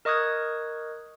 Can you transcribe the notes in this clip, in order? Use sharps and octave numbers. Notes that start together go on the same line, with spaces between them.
A#4 D#5 C#6 D#6 F#6 G#6